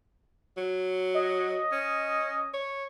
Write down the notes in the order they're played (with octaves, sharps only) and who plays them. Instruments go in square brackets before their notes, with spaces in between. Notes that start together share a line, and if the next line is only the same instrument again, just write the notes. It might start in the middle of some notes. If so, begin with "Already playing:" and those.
[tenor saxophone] F#3
[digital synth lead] D#5
[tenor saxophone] C#4
C#5